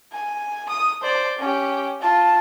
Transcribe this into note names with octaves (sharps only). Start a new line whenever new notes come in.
G#5
D#6
C5 D5
C#4 G4
F4 A5